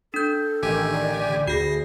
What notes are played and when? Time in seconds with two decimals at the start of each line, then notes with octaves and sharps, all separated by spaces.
0.14 D4 A4 G6
0.62 A1 D#3 G4 G#5
0.93 D5
1.27 D3
1.47 D2 F#4 G#4 A#6 C7